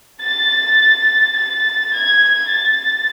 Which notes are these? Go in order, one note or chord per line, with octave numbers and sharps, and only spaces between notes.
A6
A6
G#6
A6